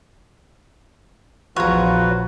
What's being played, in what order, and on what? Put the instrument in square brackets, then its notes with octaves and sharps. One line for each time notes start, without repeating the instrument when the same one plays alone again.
[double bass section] A#1 F3 [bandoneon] E2 F4 [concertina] F#4 B4 [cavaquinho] C#5 A#5